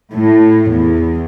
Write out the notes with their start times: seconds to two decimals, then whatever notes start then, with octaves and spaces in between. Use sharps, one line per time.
0.12 A2
0.71 E2